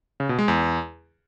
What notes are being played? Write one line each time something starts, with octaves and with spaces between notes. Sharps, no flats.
C#3
B2
G#3
E2